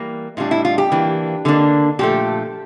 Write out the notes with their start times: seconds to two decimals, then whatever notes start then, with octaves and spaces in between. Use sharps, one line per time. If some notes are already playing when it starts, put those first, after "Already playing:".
Already playing: E3 G3 A#3
0.37 A2 G3 D4 F4
0.51 E4
0.65 F4
0.78 G4
0.92 E3 A#3 D4
1.45 D3 G3 A#3 D4
1.99 A#2 F3 A3 G4